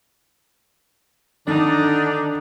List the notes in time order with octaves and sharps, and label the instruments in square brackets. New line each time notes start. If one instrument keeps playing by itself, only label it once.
[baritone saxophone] D3 [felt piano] D#3 [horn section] D4 [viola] D#4